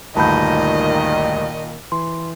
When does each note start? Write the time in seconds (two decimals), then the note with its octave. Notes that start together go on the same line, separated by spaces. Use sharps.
0.16 D2 G2 A#2 D#3 D#5 A5 B5 G6
1.92 E3 C6